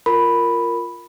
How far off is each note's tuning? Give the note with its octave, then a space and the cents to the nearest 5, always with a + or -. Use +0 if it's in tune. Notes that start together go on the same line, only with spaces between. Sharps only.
F4 +0 A#4 -5 B5 +0